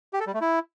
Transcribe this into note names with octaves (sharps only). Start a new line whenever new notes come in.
G4
A4
G3
A3
E4